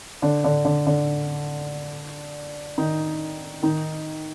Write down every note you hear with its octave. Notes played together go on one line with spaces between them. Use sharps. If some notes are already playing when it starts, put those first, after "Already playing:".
D3 D4
D3 D4
D3 D4
D3 D4
D#3 D#4
D#3 D#4